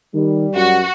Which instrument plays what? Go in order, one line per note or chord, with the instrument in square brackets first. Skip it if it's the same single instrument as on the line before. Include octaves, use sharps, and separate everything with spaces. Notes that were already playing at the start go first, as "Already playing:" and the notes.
[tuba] D#3 [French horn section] G3
[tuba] F#2 [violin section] F#4